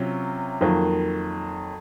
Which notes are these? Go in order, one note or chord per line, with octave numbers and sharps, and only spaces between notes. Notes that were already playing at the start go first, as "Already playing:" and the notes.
Already playing: C3 F#3 C#4 F4
F2 D#3 F#3 A#3